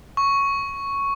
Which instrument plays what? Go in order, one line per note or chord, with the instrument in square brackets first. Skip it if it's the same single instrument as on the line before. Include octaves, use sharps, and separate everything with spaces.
[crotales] C#6